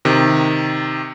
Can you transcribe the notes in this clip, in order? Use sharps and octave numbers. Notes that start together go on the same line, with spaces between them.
C3 D#3